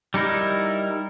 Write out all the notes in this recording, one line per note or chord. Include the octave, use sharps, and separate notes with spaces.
G3 D#4 E4 A#4